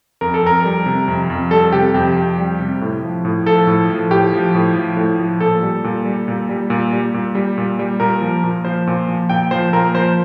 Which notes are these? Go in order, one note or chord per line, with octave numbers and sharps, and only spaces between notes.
F2 A#4
A4
F2 A#4
G3
C3
F2
F2
G3 A4
C3 G4
F2 G4
F2
G3
C3
A2
F3
A2
F3 A4
A2
F3
A2 G4
F3
A2
F3
A2
F3
A#2 A4
G3
A#2
G3
A#2
G3
A#2
G3
A#2
G3
A#2
G3
A#2 A#4
F3
A#2
F3 C5
A#2
F3
A#2 G5
F3 C5
A#2 A#4
F3 C5